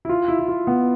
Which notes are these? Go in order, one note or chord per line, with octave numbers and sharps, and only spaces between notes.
E4
F4
E4
E4
F4
B3